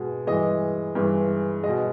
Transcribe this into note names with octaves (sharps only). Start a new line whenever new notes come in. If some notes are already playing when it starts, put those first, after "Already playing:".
Already playing: B2 G#3
G2 E3 G#3 D#5
G2 E3 G#3
B2 G#3 D#5